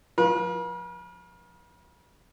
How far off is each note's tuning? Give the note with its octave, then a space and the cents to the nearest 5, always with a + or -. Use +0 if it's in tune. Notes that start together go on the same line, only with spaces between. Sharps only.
F3 +20 B4 -40